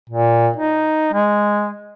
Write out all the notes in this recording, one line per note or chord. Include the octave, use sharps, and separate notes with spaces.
A#2
D#4
G#3